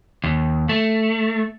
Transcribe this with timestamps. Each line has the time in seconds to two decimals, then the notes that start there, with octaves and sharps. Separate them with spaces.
0.24 D#2
0.69 A3